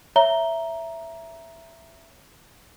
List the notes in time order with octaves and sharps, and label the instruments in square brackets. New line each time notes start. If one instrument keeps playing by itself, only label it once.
[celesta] C#5 E5 A#5 G7